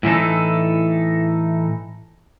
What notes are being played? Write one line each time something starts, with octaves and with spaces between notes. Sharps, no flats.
A2 E3 D#4 A4